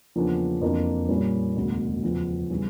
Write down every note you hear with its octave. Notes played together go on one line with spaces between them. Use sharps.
E2 C#3 F3 A#3 D4
F2 E3 A#3 D4
A#2 G3 A#3 C#4
E1 D2 C#3
E2 C#3 F3
C#3 E3 G3